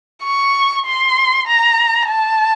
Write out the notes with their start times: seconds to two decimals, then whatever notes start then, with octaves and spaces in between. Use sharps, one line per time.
0.24 C#6
0.86 C6
1.47 A#5
2.09 A5